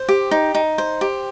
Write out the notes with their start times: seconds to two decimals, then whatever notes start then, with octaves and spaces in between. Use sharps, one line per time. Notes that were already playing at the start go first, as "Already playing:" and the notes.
Already playing: C5
0.08 G4
0.31 D#4
0.54 D#4
0.78 C5
1.01 G4